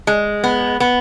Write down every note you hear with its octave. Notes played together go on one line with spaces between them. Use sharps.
G#3
B3
B3